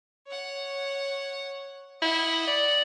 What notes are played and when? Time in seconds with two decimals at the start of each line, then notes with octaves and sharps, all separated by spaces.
0.27 C#5 F#5
2.02 E4 D#5 F#5
2.47 D5